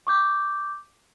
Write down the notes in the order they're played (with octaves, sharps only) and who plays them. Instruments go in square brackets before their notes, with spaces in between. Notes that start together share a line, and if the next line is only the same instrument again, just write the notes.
[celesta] C#6 D6 G6